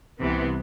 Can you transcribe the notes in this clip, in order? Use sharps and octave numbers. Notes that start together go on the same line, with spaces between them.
C2 C3 E3 B3